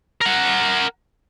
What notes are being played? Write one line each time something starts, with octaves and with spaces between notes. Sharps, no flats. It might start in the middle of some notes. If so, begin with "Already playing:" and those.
A#4 F#5